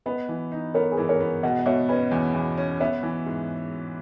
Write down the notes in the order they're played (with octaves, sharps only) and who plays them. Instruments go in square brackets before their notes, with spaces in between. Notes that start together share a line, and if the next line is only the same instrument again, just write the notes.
[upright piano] B3 [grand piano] B4 D#5
[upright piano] E3
D#4
[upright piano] B3 [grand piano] A#4 C#5
[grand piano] G#4 B4
[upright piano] E3
[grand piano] A#4 C#5
[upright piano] B3
[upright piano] B2 [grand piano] D#5 F#5
[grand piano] D#5
[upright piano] B2 [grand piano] C#5 E5
[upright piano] C#4 [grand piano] B4 D#5
[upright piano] E2
E2
C#4
[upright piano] B3 [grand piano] C#5 E5
[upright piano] E3
G#2